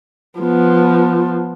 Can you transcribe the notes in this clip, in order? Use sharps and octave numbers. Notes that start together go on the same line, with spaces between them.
F3 B3